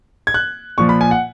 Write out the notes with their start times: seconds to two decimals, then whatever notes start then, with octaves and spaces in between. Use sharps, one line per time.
0.27 G#6
0.34 F#6
0.78 A#2 F3 C#6
0.89 B5
1.01 G#5
1.11 F#5